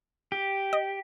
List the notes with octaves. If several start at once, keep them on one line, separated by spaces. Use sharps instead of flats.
G4
D#5